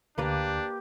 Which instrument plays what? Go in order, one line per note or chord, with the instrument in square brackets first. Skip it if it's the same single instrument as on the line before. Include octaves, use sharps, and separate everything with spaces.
[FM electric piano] D2 D3 [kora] A#3 B4 D5 [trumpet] D4 [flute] G4